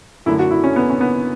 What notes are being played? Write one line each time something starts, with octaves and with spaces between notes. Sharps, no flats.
F#2 D3 A3 E4
F#4
E4
C#4
B3
C#4
B3